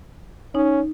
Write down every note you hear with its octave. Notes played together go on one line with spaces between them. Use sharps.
C#4 D#4